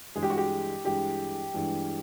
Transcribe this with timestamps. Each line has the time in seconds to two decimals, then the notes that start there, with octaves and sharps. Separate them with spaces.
0.15 G2 E3 G#3 G#4
0.23 G4
0.30 F#4
0.37 G4
0.84 G2 E3 G#3 G4
1.54 G2 E3 G#3